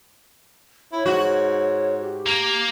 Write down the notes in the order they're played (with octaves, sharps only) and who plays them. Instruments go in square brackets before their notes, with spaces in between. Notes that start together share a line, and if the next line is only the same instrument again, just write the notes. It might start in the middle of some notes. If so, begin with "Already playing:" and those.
[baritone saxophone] E4 [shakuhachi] C#5
[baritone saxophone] G#2 [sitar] F#4
[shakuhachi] G4
[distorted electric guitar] A#3